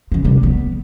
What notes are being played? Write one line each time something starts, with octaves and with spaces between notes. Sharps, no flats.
C#2 F3
C3 G3
B3